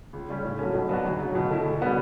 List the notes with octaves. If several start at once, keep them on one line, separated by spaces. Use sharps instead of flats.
C#2
C#3 G3 C#4
A2
F#3 A3 C#4
B2
F#3 B3 D4 F#4
D2
C#3 F#3
B2
A3 E4
D2
C#3 G3 B3 F#4